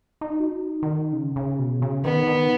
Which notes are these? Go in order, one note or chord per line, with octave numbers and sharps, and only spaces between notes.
D#4
F#4
D#4
D#3
C#3
C#3
B2
C#3
D#3 B3
D#3